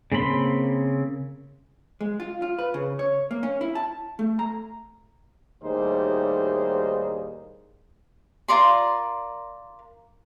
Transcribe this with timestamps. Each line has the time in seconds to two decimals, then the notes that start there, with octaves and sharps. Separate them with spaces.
0.12 C#3 A#3 C4 B5 C6
2.01 G#3
2.20 F4
2.42 F4
2.59 B4
2.74 C#3
2.99 C#5
3.31 A#3
3.43 C#4
3.61 E4
3.75 A5
4.19 A3
4.39 A#5
5.63 D#2 A2 G3 D#4 G#4 C5
8.48 F4 A#4 D5 C6